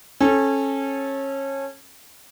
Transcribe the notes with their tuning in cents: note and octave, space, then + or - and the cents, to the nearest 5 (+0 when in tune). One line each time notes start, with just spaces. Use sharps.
C#4 -25 A4 -20